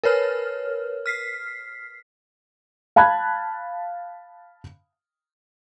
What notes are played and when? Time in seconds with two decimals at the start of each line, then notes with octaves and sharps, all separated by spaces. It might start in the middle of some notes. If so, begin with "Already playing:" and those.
0.04 A#4 B4 C#5 F6
1.06 F6 B6 C7
2.96 F5 A5 B5 F#6 G#6